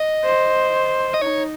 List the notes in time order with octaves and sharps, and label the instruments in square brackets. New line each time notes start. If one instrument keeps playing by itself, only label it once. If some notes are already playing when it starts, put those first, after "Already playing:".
Already playing: [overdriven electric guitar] D#5
[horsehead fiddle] C5
[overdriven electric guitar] D#5
[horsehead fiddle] D#4 [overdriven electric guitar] C#5